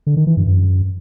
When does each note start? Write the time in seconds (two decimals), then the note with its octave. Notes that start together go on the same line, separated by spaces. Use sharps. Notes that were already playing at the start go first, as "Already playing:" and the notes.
0.07 D3
0.17 D#3
0.27 E3
0.37 G2
0.47 F#2